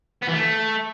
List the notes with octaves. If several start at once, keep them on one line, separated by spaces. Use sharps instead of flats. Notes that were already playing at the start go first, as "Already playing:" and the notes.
B3
E3
A3